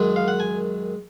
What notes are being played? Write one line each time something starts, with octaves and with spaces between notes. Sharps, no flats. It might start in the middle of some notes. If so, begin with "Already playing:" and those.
Already playing: F#2 D#3 G#3
F5
F#5
G#5